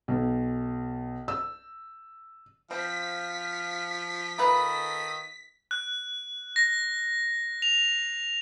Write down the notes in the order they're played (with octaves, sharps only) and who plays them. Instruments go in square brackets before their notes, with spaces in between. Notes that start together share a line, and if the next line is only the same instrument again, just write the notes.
[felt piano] B1
E6
[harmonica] F3 [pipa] C4 [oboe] F5 [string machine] B6
[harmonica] D#3 D#6 [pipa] D#4 F4 B4 [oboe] A4
[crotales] F#6
A#6
F7